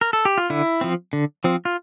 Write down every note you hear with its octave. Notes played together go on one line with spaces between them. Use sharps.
A#4
A4
G4
F4
D3 E4
F3 C4
D3
F3 C4
F4